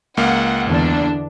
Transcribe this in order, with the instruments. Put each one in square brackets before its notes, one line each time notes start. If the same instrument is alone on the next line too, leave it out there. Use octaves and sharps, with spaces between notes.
[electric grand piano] C#2 A#3 F5 [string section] F#5
[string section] E2 D3 D4